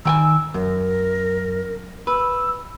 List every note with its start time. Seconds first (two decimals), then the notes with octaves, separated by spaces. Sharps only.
0.05 D#3 G5 G#5 E6
0.54 F#2 A#4
2.07 B4 E6